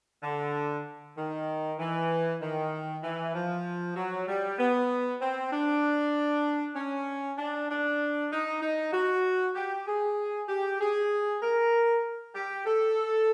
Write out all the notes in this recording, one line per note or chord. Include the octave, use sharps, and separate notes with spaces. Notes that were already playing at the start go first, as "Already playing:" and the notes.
D3
D#3
E3
D#3
E3
F3
F#3
G3
B3
C4
D4
C#4
D4
D4
D#4
D#4
F#4
G4
G#4
G4
G#4
A#4
G4
A4